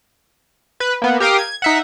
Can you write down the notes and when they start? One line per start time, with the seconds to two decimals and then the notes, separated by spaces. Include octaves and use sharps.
0.80 B4
1.02 A#3 B3
1.20 G4 A#4 F5 G5 D#6
1.38 G#6
1.62 D#4 E5 F#5